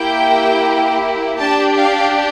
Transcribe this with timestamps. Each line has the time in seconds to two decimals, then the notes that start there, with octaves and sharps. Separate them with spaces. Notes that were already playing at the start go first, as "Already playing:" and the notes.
Already playing: A#3 E4 G4 G5
1.39 D4 G4 A5
1.77 F5